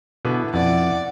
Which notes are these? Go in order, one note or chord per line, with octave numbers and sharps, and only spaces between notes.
B2 D3 E3 B3
F2 E3 D5 F#5